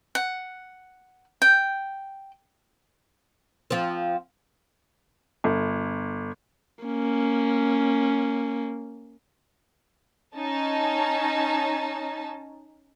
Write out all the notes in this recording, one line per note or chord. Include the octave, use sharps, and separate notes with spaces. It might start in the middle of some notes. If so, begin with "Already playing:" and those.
F#5
G5
F3 C4
G1
A#3 C#4
C#4 D#4 A5